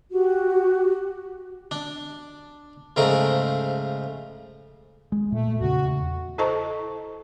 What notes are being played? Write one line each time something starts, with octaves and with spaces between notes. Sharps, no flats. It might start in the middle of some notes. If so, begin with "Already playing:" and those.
F#4 G4
D4
G#2 C#3 F3 A3 A#4 A#5
G#3
A#2 A3
E2 C#3 F#4
E4 A4 C5 D#5 A5 C#6